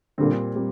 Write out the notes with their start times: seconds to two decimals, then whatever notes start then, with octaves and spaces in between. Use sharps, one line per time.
0.18 A#2 D3 G3 C4
0.55 G3 C4